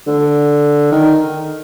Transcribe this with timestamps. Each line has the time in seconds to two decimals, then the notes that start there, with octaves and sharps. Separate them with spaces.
0.07 D3
0.92 D#3